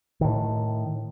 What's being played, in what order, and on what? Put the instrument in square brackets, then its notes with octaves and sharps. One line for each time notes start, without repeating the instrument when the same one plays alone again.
[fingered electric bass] A2 D#3